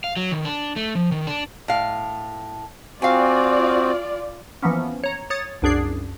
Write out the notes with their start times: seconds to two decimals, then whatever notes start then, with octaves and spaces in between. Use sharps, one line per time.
0.04 F5
0.17 F#3
0.32 D#3
0.45 D4
0.76 A3
0.95 F3
1.12 D#3
1.27 D4
1.68 A2 F5
3.02 C4 F4 F#4 D5 F5 G5 G#5
4.62 E3 F3 A#3 B3 C#4
5.04 C#5 A#5
5.30 C#5 D#6 A6
5.62 C2 F#2 D4 G#4 D5 C7